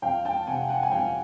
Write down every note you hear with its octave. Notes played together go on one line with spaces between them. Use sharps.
F2 F5 G5
G5 A5
C3 F#5 G#5
F#5 G#5
G#5
F2 F5 G5